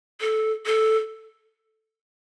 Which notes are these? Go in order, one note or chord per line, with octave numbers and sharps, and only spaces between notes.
A4
A4